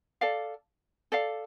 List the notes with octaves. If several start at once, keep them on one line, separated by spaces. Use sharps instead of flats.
A4 D5 F5
A4 D5 F5